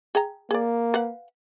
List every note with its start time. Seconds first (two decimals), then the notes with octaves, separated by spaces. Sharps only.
0.15 G#4 G5 A#5
0.51 A#3 G#4 D5
0.94 B4 F5 F#5